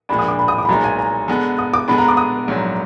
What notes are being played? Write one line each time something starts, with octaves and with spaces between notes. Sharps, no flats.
A#1 A#2 G#3 D4 B5
D#6
D6
B5
D#6
D6
B5
B1 A#2 G#3 D#4 A#5
G#5
A#5
D3 G#3 B3
D#6
D6
D3 G#3 B3 D4 B5
A#5
D6
D#6
A#1 G#2 F#3